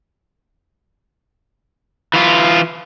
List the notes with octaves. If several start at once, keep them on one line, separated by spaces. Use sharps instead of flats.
E3 F4